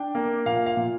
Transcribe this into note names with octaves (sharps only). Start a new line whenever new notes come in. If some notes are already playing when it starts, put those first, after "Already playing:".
Already playing: D4 G5
A#3
A#2 F5
F5
A#2